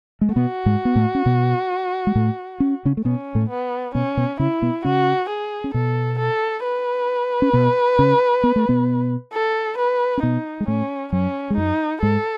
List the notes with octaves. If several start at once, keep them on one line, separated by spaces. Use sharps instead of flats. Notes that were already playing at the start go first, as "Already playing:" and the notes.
G#3
A3
B2 B3 F#4
G#2 G#3
B3
A2 A3
C#4
B2 B3
G#3
A2 A3
C#4
C#3 C#4
A3
B2 B3 C#4
A2 A3
B3
B2 B3 C#4
B2 B3
C#3 C#4 E4
B2 B3
C#3 C#4 F#4
G#4
C#4
B2 B3 A4
A4
B4
C#4
B2 B3
C#3 C#4
B3
A3
B2 B3
A4
B4
C#4
B2 B3 D#4
G#3
A2 A3 C#4
F#2 F#3 C#4
G#3
F#2 F#3 D#4
G#2 G#3 A4